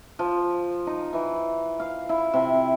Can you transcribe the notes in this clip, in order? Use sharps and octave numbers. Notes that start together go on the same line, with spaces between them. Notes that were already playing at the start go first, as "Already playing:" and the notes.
F3
D#4
E3
F5
E4
C3